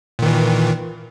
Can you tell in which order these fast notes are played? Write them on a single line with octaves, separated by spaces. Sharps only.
A#2 D#3 E3